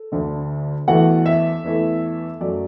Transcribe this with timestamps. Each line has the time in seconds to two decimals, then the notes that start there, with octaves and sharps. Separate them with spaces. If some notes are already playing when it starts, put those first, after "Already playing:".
Already playing: A4
0.12 D2 D3 A3
0.88 E2 E3 A3 F#4 F#5
1.26 E5
1.64 E2 E3 A3
2.41 F#2 F#3 A3 D5